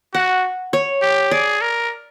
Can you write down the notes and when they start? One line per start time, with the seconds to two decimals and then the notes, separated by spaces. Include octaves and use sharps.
0.14 F#4 F#5
0.73 C#5
1.02 G4
1.31 G#4 D5
1.61 A#4